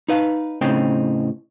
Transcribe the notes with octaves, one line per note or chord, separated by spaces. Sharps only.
D#4 B4 F5
A2 C#3 C4 D#4 G5